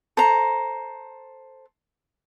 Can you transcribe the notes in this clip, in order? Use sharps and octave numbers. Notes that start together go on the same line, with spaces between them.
A4 C5 A#5